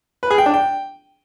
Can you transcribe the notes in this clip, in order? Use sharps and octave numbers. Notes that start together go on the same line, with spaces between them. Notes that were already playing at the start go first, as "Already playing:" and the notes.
B4
G#4
G5
D4
G5